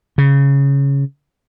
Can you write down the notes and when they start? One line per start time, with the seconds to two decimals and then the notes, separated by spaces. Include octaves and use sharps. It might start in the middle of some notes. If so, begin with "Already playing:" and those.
0.18 C#3